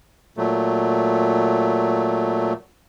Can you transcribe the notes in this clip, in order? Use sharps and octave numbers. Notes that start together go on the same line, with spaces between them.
A#2 F#3 A3